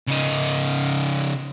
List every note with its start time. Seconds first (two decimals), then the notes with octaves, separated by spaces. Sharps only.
0.08 C#3 D#4